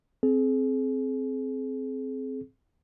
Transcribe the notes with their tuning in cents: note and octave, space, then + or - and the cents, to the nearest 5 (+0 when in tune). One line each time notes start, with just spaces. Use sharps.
C4 +0 G#4 +35